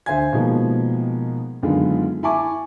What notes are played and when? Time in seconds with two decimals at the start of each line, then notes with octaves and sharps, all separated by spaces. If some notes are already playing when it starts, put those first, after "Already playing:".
0.06 D2 C5 E5 G#5 G#6
0.33 B2 D#3 F3 G#3 A#3 B3
1.63 F#2 D3 D#3 G#3 B3 F4
2.23 E4 E5 G#5 A5 C#6 D6